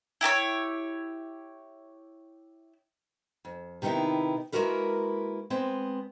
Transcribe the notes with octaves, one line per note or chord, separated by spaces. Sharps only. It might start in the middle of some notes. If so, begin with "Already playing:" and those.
E4 G4 A4 C#5
F2
C3 D#3 B3 D#4 E4
G#3 A#3 E4 F#4 A#4 B4
G#3 B3 C4